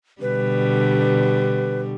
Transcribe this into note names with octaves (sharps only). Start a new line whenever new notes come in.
B2 D3 G3 B4